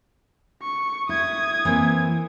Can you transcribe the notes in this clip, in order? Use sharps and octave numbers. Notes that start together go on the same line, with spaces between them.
C#6
E4 D#6 G#6
E3 A#3 C4